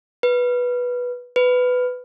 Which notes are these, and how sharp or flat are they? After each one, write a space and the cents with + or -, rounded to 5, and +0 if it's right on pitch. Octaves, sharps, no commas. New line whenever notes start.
B4 -10
B4 +15